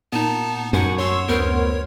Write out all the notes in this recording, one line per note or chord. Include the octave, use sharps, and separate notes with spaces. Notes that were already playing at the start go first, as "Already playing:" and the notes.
A#2 B3 D#4 A5
F#2 F#5 G#5 C#6
C#5 C6 C#6 E6
D2 B3 A#4 C5